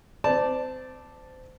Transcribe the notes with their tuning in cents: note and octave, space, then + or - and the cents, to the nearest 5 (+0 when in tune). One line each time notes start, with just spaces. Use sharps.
C4 -25 D5 +0 A5 +0